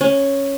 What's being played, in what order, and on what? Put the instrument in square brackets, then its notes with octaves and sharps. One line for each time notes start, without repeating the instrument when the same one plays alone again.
[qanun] C#4